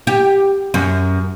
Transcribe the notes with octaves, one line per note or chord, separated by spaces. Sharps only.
G4
F#2